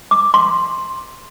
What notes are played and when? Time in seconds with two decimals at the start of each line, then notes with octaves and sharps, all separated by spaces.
0.11 D6
0.34 C6